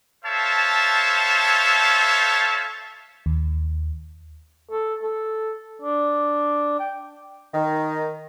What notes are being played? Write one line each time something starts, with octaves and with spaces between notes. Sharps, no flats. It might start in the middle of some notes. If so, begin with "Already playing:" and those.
A4 C5 C#5 E5 F5 A5
D#2
A4
A4
D4
G5
D#3